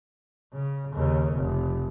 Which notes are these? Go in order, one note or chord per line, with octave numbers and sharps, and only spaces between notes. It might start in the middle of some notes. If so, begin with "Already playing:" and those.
C#3
D#2 C#3
F1